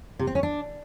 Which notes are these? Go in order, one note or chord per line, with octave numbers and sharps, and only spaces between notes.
C3
C4
C#4
D4